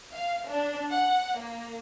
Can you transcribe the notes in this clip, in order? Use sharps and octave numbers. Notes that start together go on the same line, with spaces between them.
F5
D4
F#5
A#3